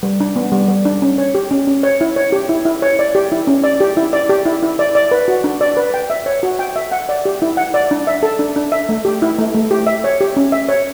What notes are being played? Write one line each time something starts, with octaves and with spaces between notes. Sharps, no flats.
G3
D4
B3
G3
G3
D4
C#4
C#5
G4
C#4
C#4
C#5
E4
C#5
G4
E4
E4
C#5
D5
G4
E4
C#4
D5
G4
E4
D5
G4
E4
E4
D5
D5
B4
F#4
D4
D5
B4
G5
E5
C#5
F#4
G5
E5
F#5
D5
G4
E4
F#5
D5
D4
E5
A4
D4
D4
E5
A3
G4
E4
A3
A3
G4
E5
C#5
G4
C#4
E5
C#5